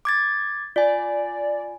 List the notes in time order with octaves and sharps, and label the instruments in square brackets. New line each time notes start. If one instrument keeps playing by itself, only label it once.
[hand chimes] D6 G#6 A6
[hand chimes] F4 G#5 [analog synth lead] D5